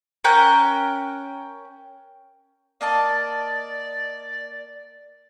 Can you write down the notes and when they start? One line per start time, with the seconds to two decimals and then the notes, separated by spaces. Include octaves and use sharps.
0.24 C#4 A#4 G5 F#6
2.81 A#3 D5 D#5 A5